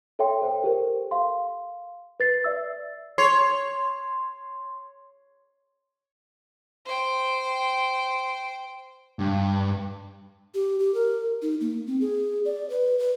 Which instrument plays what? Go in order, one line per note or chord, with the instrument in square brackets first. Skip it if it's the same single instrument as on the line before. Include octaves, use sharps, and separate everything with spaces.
[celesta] A4 C#5 E5 G5 C6
A4 C5 G5
G4 A4 A#4 C5
F5 C6
B4 A6 C7
D5 E5 E6
[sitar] C#5 [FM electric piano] C6
[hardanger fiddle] C5 G5
[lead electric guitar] G2
[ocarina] G4
G4
A#4
D#4
A#3
C4
G#4
D5
B4
B4